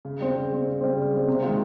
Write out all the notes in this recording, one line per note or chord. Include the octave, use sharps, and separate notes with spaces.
C#3
G3 C4
C#3
G3 C4
C#3
G3 C4
C#3
G3 C4
C3
D#3 G#3 C4 F4